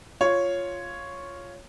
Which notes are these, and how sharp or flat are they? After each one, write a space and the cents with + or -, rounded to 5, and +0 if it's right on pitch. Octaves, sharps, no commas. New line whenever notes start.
F4 +0 C#5 +0